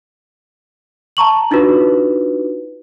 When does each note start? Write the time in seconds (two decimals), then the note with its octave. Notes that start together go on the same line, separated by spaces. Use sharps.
1.17 A5 A#5 C#6 F#7
1.51 D4 D#4 F4 F#4 B4